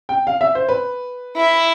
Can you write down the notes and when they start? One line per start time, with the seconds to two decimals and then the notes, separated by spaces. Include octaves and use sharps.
0.09 G5
0.27 F5
0.41 E5
0.55 C5
0.69 B4
1.37 E4